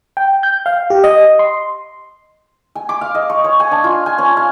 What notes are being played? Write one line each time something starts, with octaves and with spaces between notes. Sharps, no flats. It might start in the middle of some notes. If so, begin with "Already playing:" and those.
G5
G6
F5
G4
D#5
C6
G#5
D6
F5
D#5
C#6
C#5
G#5
D4
F4
G#5
C#4
F5